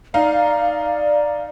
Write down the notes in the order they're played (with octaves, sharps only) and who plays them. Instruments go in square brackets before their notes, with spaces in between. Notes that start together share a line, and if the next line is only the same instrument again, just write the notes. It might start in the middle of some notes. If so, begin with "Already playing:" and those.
[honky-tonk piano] D#4 F5 [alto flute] D5